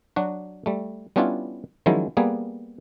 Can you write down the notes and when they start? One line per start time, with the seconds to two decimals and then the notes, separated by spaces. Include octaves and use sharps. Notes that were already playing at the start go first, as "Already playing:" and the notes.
0.16 F#3 D4 F#4
0.66 G3 A3
1.16 G3 B3 C#4 D4 E4 F4
1.86 D#3 F3 F#3 G#3 C#4 E4
2.17 G3 A#3 B3 G#4